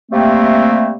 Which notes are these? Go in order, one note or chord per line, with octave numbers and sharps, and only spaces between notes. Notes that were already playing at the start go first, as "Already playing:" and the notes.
C3 G3 A3 A#3 C4